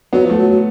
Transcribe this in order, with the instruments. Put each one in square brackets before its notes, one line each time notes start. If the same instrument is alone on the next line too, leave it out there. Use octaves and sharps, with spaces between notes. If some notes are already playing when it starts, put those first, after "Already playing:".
[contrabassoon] F#3 [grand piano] B3
[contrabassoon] F3
[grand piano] A3
[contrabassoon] F#3
F#3